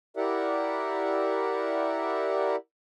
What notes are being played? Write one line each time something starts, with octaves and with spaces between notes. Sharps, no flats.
E4 G4 A#4 D5 E5 F#5